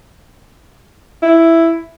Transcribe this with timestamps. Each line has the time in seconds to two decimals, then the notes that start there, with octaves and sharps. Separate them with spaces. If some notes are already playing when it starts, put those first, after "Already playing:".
1.23 E4